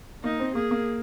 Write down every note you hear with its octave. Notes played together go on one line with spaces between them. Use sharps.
A#3 D#4
C4
A#3 G#4
A#3